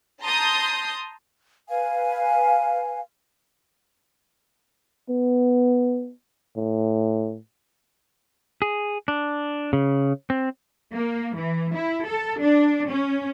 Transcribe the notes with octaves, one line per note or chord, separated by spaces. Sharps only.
A5 A#5 C6 D#6 G6
B4 F5 G#5
B3
A2
G#4
D4
C#3
C4
A#3
E3
E4
A4
D4
C#4